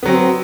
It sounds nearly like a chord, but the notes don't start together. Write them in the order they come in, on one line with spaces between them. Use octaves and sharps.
B3 F#3 C4